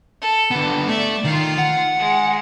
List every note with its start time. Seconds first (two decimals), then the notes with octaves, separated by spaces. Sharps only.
0.22 A4
0.51 D3 B3
0.88 A3 D5 E5
1.25 D#3 F4 F5
1.58 F#5
1.99 G#3